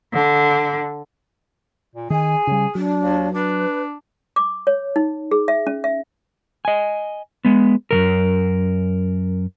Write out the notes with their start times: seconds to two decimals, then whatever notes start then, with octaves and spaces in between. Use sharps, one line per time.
0.11 D3
1.95 A#2
2.10 D#3 G#4 G#5
2.47 C#3 G3
2.75 F#3 D4
3.00 D#2
3.34 D4 B4
4.36 D6
4.67 C#5
4.96 D#4
5.31 G#4
5.48 E5
5.67 C#4
5.84 E5
6.65 D#5 G#5
7.45 G#3 B3
7.91 F#2 C3 A#4